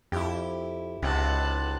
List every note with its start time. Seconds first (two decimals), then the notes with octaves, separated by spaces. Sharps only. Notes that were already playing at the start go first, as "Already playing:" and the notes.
0.12 F2 E4 G4
1.02 C#2 G#2 C3 B3 A5 F#6